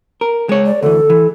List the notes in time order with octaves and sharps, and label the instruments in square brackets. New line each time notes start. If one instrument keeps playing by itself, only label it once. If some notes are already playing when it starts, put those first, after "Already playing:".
[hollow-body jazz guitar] A#4
G#3 C#5
[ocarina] D5
[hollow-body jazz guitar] D2 E3 [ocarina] A4
[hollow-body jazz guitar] E3